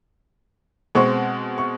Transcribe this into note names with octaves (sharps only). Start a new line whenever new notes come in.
B2 G#3 C4 C#6
C#6